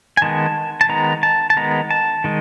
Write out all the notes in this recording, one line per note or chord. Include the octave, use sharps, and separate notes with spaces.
G#5
D#3 G#3 B3 A5
A5
D#3 G#3 B3 A#5
A5
A5
D#3 G#3 B3 A#5
A5
D#3 G#3